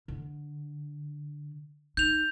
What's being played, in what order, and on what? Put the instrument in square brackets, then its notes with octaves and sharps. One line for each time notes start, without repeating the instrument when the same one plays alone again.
[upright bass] D3
[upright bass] D#4 [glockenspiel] G6 F7